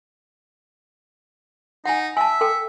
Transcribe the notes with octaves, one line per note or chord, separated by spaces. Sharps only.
D#4 F#5 G#5
E5 G#5 A5
A4 G5